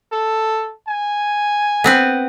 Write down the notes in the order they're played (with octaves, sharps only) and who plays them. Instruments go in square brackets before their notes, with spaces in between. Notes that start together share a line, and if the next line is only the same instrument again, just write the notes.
[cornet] A4
G#5
[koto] B3 C4 B4